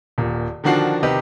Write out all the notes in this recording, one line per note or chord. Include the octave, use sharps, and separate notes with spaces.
D#1 A#2
D3 D#3 F3 D4 F#4 C7
C3 D#3 G4 B4 D#5